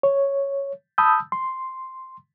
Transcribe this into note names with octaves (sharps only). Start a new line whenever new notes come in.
C#5
A5 B5 D#6 E6 G6
C6